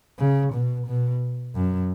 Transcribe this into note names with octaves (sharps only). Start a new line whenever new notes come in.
C#3
B2
B2
F#2